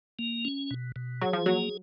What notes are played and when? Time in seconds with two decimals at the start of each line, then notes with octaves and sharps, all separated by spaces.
0.19 A#3
0.45 C#4
0.71 B2
0.96 B2
1.21 F#3 G#4
1.33 F3
1.46 F#3 A#3